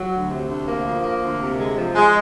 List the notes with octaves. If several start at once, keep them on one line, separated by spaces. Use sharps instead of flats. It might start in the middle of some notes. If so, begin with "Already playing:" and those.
Already playing: F#3
D2
C3
D2
A#3
F3
A#3
D2
C3
G#3
F3
G#3